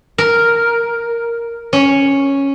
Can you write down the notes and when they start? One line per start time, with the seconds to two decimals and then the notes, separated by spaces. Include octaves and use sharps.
0.18 A#4
1.73 C#4